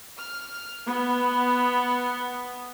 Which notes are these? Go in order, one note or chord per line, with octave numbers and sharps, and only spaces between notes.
F6
B3